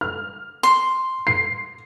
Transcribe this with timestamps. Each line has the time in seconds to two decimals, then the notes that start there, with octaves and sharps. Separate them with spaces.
0.01 F6
0.63 C6
1.27 C7